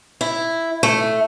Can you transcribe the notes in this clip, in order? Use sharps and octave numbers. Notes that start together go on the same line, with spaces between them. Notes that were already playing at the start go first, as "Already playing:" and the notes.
E4
A3